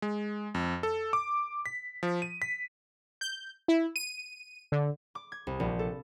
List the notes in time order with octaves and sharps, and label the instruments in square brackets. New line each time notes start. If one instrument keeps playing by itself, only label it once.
[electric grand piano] G#3
F2
A4
D6
B6
F3
D#7
B6
[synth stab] G6
E4
D#7
D3
[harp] D6
G#6
C2
A#1
A4